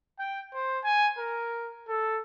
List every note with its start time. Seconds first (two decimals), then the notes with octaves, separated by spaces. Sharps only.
0.19 G5
0.54 C5
0.84 G#5
1.18 A#4
1.88 A4